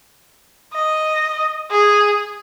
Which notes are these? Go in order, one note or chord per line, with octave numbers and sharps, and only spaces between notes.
D#5
G#4